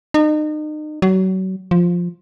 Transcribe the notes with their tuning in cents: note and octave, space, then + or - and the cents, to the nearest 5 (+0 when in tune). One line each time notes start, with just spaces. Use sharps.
D#4 -35
F#3 +30
F3 +5